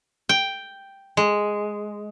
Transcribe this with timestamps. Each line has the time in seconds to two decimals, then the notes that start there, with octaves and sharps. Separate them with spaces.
0.29 G5
1.17 G#3